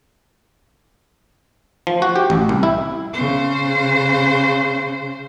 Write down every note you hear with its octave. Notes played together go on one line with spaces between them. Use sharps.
F3
F#4
G4
A1
C2
E4
C#3 C5